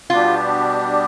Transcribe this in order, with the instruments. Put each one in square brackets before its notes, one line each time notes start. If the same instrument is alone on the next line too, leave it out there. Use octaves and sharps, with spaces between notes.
[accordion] B2 G3 B3 D4 G4 [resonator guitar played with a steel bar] F4